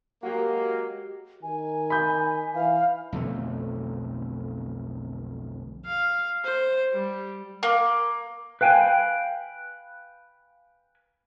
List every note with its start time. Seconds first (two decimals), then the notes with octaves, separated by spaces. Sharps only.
0.23 F#3 G#3 A#3 F#4 G4
1.43 D#3 G#5
1.90 B5 G6
2.54 E3 F5
3.12 B1 F2 D3 A3
5.85 F5
6.44 C5
6.93 G3
7.63 A#3
8.61 B4 F5 G5 G#5